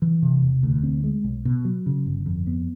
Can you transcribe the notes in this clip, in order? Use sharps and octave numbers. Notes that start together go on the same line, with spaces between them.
E3
C3
E1
D2
C4
G#3
B1
B2
F#3
C#3
G1
F2
B3